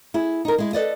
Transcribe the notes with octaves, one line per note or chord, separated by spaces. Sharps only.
E4 G#4
D#4 A#4
G#3 E4
A4 B4 D5 D#5